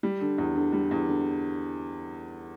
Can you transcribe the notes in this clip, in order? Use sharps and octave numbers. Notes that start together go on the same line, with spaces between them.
G3
D3
E2
D3
G3
E2
D3